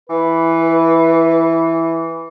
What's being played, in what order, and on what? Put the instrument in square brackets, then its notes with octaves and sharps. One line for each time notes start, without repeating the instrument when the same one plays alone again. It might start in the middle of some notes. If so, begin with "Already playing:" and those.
[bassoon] E3 [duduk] B4